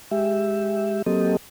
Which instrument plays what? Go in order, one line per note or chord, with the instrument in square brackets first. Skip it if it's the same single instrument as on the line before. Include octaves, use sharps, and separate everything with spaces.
[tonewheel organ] G#3 G4 E5
F#3 A#3 C4 G4 A4 D#5